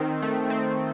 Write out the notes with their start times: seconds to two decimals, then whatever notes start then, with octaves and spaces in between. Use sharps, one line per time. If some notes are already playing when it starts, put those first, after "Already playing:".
Already playing: D#3 C4
0.22 A3
0.50 C4